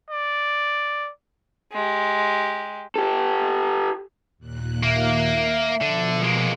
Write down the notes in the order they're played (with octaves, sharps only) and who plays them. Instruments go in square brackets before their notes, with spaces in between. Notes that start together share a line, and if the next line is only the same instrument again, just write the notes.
[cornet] D5
[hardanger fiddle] G#3 G4
[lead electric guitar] G4 A4
[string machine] D#2 A#2 F#6
[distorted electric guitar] A#3 [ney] E5
[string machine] B2 F3 [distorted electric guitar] D3
[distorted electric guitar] G#3 A#3